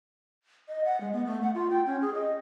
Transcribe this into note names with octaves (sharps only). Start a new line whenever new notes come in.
D#5
F#5
G#3
B3
A3
F#5
F4
G5
C#4
G#4
D#5